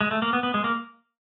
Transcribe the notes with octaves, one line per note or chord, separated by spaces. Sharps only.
G#3
A3
A#3
B3
B3
G#3
A#3